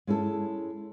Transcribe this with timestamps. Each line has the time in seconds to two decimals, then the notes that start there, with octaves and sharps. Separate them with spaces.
0.07 G#3 C#4 E4 A4